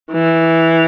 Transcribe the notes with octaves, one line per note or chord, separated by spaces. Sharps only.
E3